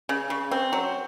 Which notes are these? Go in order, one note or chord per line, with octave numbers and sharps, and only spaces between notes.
C#3
C#3
C4
F#3